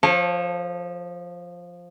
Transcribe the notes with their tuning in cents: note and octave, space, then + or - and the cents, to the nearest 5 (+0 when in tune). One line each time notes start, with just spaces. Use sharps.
F3 +5 A4 +0 C#5 -30